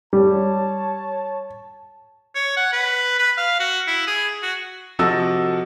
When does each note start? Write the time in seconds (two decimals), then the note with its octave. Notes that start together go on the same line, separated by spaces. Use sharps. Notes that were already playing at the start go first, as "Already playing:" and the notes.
0.13 G3 C#5 A5
2.35 C#5
2.57 F#5
2.72 B4
3.19 B4
3.38 F5
3.60 F#4
3.87 E4
4.07 G#4
4.42 F#4
4.99 C3 F3 F#4 A4 D#5 E6